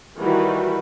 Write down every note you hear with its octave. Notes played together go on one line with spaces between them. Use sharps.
D#3 E3 G3 F#4 B4